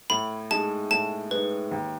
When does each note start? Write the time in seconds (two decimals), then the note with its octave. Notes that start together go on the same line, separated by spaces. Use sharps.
0.10 A2 B5
0.51 G#3 D#4 A5
0.91 A2 A5
1.31 G#3 D#4 B4
1.71 D#2